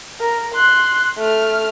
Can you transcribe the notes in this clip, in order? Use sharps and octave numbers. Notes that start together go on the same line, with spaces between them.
A#4
C6 F#6
A3 F6